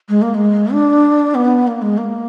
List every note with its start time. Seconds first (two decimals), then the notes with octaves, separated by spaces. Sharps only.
0.09 G#3
0.22 A#3
0.34 G#3
0.72 D4
1.35 B3
1.67 A#3
1.82 G#3
1.98 A#3